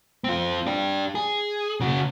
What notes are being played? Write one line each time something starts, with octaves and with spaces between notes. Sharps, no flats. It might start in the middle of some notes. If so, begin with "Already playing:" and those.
C4 F4
D4 G4
G#4
C#3 F#4